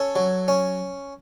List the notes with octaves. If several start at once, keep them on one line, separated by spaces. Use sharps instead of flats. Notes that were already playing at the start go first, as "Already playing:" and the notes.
Already playing: C#4 A4 C#5
F#3
C#4